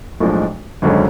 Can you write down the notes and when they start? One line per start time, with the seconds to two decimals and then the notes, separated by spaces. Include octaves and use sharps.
0.20 B1 A2 F3 G#3 D4
0.82 G#1 F#2 D3 G#3 C#4